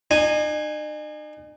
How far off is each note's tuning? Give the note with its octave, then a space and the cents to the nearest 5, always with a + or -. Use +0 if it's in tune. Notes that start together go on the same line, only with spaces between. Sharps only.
D#4 -45 G#5 -5